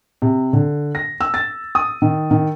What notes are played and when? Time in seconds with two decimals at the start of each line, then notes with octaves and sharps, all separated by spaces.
0.22 C3
0.53 D3
0.95 A#6
1.21 E6
1.34 A6
1.75 D#6
2.02 D#3
2.31 D#3